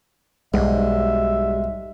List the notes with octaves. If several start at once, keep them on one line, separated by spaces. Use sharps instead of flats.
B1 G#2 G3 E5